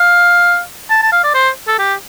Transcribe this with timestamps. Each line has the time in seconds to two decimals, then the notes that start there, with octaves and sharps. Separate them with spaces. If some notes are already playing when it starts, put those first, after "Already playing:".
Already playing: F5
0.90 A5
1.02 A5
1.12 F5
1.24 D5
1.34 C5
1.68 A4
1.79 G4